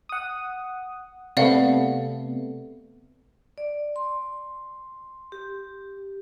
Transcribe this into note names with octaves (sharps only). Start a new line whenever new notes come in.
F#5 D#6
C3 A3 B3 D5 F5 F#5
D5
C6
G4